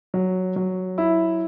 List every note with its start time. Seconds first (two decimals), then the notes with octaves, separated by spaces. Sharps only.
0.14 F#3
0.56 F#3
0.98 E4